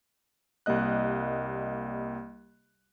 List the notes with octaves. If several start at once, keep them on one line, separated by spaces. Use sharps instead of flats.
C2 G3 A#3 D#5 F#6